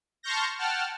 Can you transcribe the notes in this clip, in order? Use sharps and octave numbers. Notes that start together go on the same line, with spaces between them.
A5 C6 C#6 F6 G6 A#6
F#5 G5 A5 F6